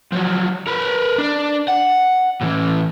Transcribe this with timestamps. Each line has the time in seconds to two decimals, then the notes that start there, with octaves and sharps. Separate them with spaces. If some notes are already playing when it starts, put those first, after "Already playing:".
0.12 F3 F#3
0.67 A#4 B4
1.18 D4
1.68 F#5
2.42 A2 E3